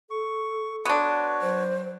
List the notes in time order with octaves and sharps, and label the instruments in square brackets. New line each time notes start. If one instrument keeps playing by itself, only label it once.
[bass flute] A4 [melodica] C#6
[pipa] B3 D4 [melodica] F#4 B4 C#5 [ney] C6
[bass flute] F#3 [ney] C5